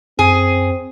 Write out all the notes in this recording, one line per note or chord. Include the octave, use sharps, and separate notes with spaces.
F#2 C4 G#4